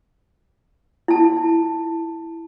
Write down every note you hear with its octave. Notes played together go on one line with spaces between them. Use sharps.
E4 A5